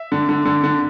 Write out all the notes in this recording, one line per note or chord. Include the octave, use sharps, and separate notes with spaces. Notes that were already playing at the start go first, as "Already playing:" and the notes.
Already playing: E5
D3
D3
D3
D3